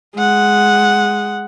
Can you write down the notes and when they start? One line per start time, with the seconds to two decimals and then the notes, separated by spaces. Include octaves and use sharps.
0.16 G#3 F#5